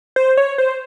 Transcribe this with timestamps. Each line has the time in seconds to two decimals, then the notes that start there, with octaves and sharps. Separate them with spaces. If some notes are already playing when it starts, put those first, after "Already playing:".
0.16 C5
0.37 C#5
0.58 C5